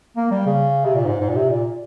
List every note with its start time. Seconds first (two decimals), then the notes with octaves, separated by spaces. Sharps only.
0.16 A#3
0.31 G3
0.46 C#3
0.85 C3
0.95 A#2
1.05 G#2
1.20 G#2
1.29 A#2
1.36 C3
1.50 A#2